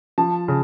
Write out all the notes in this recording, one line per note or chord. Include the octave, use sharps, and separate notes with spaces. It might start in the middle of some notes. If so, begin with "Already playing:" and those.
F3 A5
C#3